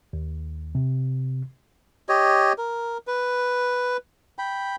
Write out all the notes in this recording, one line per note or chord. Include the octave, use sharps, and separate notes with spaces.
D#2
C3
G4 C#5 D#5
A#4
B4
G5 B5